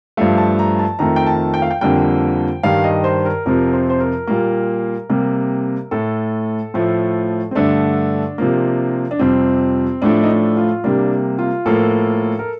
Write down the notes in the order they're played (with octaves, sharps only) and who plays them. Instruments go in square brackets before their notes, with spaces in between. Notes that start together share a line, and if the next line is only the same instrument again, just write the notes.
[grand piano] G2 F3 A3 F5
A5
A#5
A5
F2 D#3 A3 A#5
G5
A5
G5
F5
G5
F2 D3 G3 A#3 G5
G2 D#3 G3 F5
D#5
C5
A#4
F2 C3 F3 A#4
C5
C5
A#4
A#2 G3 A#3
C3 G3 A#3
A2 A3 A4
A2 F3 A3
C4
G2 D3 A3 D4
C3 F3 A#3
D4
F2 C3 G3 C4
A2 F3 A3 D4
D#4
D4
F4
C3 G3 A#3 D4
F4
A2 F3 A#3 A4
A#4